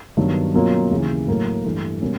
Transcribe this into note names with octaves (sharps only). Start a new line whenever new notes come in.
G2 D#3 F#3 B3
B2 F#3 A#3 C#4 F4
D#2 C#3 E3
A2 F#3 A#3
G2 E3 A3
B2 G3 A#3 C#4